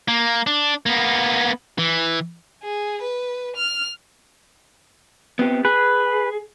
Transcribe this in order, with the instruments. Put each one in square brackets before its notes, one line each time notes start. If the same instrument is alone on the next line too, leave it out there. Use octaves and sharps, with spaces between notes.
[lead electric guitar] A#3
D4
A#3 B3
E3
[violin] G#4
B4
F6
[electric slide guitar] B3 C4 G4
[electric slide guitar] G#4 [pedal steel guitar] B4